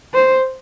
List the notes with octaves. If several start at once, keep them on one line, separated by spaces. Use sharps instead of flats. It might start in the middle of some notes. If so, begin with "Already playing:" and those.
C5